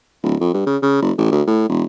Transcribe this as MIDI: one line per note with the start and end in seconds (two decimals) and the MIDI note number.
0.23 0.35 26
0.41 0.52 41
0.53 0.64 43
0.66 0.77 49
0.82 1.00 49
1.02 1.11 30
1.18 1.31 33
1.31 1.42 38
1.47 1.67 45
1.69 1.83 28